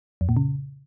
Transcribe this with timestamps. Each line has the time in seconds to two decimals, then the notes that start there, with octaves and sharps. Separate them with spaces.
0.21 F2
0.29 A#2
0.37 C#3